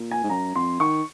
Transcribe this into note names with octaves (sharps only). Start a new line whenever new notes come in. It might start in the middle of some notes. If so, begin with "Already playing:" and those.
Already playing: A#2
G#5
G#2
F#2 A#5
F2 C6
D#3 C#6